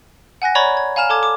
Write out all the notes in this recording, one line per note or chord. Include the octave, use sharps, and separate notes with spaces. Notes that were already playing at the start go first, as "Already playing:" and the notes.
F#5 G#5 F#6 A#6
C#5 D5 A#5 B5 C#6 G#6
G#6
F5 G#5 A#5 F6 E7
A4 A5 D6 G#6
D6